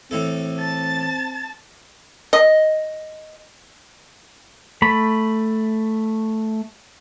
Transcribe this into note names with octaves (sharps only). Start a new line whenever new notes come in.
A2 E3 C4 A4
A5 A6
D#5
A3 B5